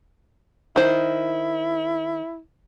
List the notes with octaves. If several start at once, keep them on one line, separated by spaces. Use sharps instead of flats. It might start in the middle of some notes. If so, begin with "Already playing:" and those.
D#3 E4 C5